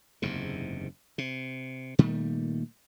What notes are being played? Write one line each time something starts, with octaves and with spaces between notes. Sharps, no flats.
F#1 E2 G#2 C3
C3
A#2 D#3 G3 A3